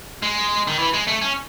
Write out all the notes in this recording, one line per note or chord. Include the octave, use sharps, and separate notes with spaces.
G#3
D#3
E3
G#3
A3
C#4